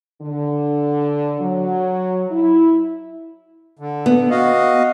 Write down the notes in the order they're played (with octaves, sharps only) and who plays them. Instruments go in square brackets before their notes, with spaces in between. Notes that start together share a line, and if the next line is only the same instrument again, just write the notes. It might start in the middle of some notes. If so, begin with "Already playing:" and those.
[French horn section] D3
F#3
E4
[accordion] D3
[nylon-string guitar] B3
[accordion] F#4 D#5 F5